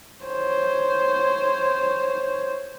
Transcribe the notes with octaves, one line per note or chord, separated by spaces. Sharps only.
C5 C#5